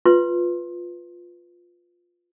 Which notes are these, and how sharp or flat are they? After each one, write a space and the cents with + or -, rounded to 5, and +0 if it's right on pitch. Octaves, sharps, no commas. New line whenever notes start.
F4 +5 B4 +0 C6 +20